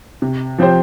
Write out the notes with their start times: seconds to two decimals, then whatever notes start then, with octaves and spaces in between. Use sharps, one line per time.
0.22 C3
0.58 F3 C4 G4 C5